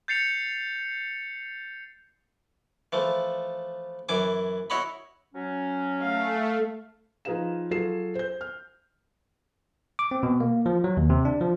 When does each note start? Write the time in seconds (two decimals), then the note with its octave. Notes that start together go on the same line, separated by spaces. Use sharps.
0.08 G6 A6 C7 C#7 F7
2.92 E3 F3 A3
4.09 F#2 E3 G#5 D6
4.70 E4 F#4 C#5 D#5 B5
5.35 F#3 C#4
6.01 A3 F5
7.25 F3 D#4 G#4 B4 F5 E7
7.71 F#3 F4 G#4 A4 C7 E7
8.15 C5 G6
8.41 F6
9.99 D6
10.11 C4
10.23 B2
10.40 A#3
10.66 F3
10.84 F#3
10.97 D#2
11.10 C3
11.25 D4
11.41 F3